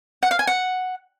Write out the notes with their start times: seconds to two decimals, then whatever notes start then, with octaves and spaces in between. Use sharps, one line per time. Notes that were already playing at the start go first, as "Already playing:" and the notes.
0.23 F#5
0.31 F5
0.39 G#5
0.47 F#5